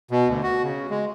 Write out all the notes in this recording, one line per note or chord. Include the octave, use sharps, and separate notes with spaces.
B2
D2
F#4
C#3
G#3